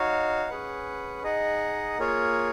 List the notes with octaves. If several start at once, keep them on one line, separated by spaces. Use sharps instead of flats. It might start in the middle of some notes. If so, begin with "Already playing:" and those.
Already playing: D#4 F#4 C#5 F5
C#4 G#4 B4 F#5
D#4 G#4 D#5 F#5
A#3 F4 G#4 C#5